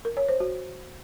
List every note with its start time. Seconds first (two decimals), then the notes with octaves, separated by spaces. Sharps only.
0.05 A#4
0.17 C#5
0.29 C5
0.40 F#4